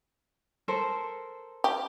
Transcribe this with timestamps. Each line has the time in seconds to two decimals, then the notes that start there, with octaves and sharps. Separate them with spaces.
0.68 A4 A#4 C5
1.64 G4